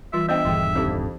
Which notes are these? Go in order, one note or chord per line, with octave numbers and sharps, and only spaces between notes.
E3 G3 F4 E5
B3 D4 C5 D#5 E5 G5
D#1 G2 D3 E3 G#4
F2 D#4 G4